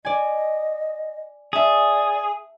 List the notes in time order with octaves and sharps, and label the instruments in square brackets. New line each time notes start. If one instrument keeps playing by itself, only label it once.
[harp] D5 G#5 [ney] D#5
[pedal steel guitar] G#4 [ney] D5 [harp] E5 A5